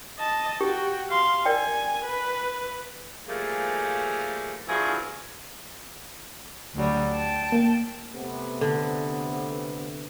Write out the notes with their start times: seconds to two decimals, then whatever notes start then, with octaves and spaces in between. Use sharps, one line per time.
0.19 D#5 A5
0.61 F#4 G4 G5
1.10 F5 C6
1.45 A#4 D5 G5 G#5
2.04 B4
3.28 F3 G3 A3 A#3 G#4
4.68 E2 G2 F3 E4 F#4 G#4
6.75 D2 F#3 G3
7.12 G5 A5
7.52 A#3
8.14 C3 A3 B3
8.61 D3